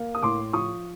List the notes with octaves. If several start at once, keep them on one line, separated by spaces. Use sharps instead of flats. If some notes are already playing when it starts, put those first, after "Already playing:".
Already playing: A#3
D#6
A2 C6 D6
F3 C#6 D#6